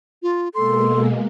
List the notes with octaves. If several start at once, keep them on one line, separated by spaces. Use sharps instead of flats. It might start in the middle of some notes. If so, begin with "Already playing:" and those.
F4
B2 G#3 A#3 A4 C6